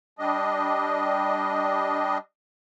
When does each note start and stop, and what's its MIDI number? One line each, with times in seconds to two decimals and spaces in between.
0.19 2.18 55
0.19 2.18 62
0.19 2.18 75